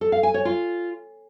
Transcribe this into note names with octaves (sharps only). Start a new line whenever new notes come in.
A4
F5
G#5
C#5
F4